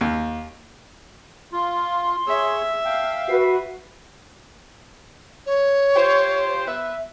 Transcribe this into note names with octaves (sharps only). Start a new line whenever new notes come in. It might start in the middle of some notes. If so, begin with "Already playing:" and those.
D#2
F4 C6
G#4 C#5 E5
F5 G5 A5
F#4 B4 C7
C#5
F4 G4 C5
B3 B4 E5